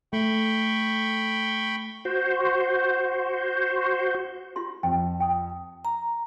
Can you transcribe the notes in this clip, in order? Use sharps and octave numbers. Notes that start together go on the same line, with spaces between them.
A3 G5 B5 C#6
F#4 C5
F4 G4 C6
F2 G5
G5 D#6
A#5